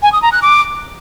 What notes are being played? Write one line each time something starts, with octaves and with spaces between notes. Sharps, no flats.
G#5
D#6
A#5
F#6
D6